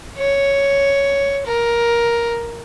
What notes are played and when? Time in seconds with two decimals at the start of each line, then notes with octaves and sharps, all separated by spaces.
0.18 C#5
1.46 A#4